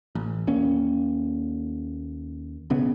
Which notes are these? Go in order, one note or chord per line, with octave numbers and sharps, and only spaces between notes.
A1
D#2 A#3 C#4
D1 B1 C#3 B3